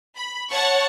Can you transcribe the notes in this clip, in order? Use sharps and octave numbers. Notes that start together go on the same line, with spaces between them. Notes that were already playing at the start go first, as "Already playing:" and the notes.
B5
C#5 F#5 A5 C#6